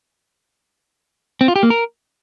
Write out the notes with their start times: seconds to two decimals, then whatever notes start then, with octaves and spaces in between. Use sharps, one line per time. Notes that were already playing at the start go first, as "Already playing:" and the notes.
1.41 C4
1.48 F4
1.56 G4
1.63 A#3
1.70 A#4